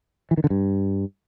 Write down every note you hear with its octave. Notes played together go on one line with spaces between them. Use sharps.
E3
D#3
D3
G2